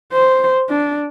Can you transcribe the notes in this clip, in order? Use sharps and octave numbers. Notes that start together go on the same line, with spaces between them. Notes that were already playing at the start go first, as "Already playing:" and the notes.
C5
D4